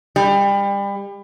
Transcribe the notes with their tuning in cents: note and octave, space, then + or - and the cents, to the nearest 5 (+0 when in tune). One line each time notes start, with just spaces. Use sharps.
G3 +30